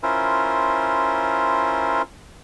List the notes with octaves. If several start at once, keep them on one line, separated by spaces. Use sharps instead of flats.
C#4 E4 F4 A#4 C5